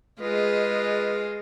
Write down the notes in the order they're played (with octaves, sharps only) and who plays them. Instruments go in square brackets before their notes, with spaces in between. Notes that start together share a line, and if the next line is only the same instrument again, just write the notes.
[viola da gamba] G#3 F4 G#4 [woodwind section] B4 D#5